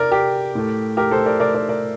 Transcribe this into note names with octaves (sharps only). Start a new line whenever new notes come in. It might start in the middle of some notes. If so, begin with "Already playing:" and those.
Already playing: C3 A#4 D5
G4 A#4
A2 A3
G4 A#4
A4 C5
A#4 D5
A#4 D5
A#4 D5
A#4 D5